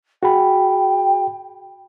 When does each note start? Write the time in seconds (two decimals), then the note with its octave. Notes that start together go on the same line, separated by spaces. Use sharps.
0.23 F#4 G#4 G5 B5